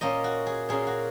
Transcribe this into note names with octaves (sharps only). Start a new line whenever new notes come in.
A#2 A#3 C#4 D#5
F#4
G#4
A#2 A#3 C#4 G#4
F#4